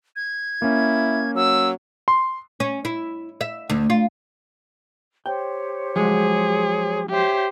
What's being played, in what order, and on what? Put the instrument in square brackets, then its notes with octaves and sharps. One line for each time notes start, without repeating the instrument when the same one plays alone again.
[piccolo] G#6
[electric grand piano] A#3 C#4 [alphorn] E4
[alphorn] F#3 [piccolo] E6
[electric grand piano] C6
[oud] C#4
E4
E5
D2
F4
[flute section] G4 C5 C#5 [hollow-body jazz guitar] G5
[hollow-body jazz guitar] F3 F#3 G#3 [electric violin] G#4
[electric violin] G4 C5 [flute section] C#5 E5